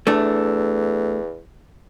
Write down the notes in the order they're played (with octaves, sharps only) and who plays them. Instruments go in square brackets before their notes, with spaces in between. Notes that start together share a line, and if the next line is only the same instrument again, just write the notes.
[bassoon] E2 [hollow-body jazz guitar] A3 D4